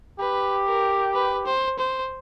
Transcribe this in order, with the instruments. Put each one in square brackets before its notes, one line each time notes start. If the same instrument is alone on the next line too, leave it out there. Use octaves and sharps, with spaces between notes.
[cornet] G4 [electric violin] B4
[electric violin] A#4
B4
C5
C5